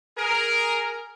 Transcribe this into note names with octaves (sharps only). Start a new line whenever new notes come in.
G#4 A#4